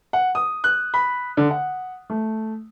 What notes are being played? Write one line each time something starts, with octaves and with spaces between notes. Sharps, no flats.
F#5
D#6
F#6
B5
D3
F#5
A3